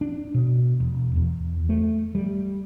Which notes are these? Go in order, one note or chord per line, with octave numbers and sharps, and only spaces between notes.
D4
B2
E1
E2
A3
G3